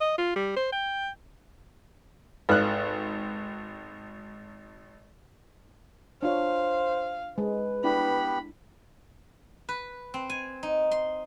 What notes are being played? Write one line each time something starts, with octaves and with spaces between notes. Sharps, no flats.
D#5
F4
G3
C5
G5
G#1 A4 B4 F5 F#6
D4 F4 C5 C#5 F5
G#3 G#4 B4
B3 D4 E4 G4 B5
B4
C4
G#5
D#4
C6